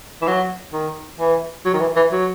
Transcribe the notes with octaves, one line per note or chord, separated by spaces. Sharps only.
E3
F#3
D#3
E3
F#3
D#3
E3
E3
F#3